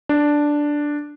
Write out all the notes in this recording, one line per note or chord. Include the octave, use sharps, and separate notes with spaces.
D4